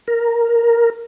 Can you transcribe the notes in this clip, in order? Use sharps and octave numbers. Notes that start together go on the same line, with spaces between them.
A#4